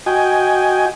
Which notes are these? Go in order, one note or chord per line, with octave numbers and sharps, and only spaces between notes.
F#4 D#5 G5 G#5